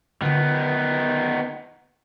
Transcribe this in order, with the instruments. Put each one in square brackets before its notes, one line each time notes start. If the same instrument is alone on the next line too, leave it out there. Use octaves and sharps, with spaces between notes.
[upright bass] D3 F4 [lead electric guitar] D#3 B3